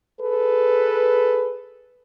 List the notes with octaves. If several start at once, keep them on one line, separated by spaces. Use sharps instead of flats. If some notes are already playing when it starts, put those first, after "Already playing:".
G#4 A4 B4